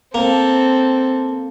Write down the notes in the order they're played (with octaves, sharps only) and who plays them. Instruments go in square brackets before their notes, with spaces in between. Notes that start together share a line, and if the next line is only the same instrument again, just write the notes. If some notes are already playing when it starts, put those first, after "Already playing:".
[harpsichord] A#3 [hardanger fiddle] C4 A4